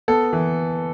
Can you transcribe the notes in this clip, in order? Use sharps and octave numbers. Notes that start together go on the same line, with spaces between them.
B3 A4
E3